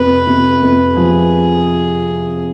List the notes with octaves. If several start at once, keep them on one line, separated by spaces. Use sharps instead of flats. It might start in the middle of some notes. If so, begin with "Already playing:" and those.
Already playing: F2 C3 B4
C3
F2
F3 G#4